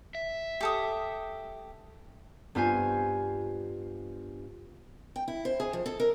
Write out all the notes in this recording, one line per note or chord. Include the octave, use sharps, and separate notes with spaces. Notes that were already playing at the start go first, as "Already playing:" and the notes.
E5
G4 A4 D#6
G2 B3 F4 C5 G#5
G5
E4
C5
G#4
F3
A4
A#4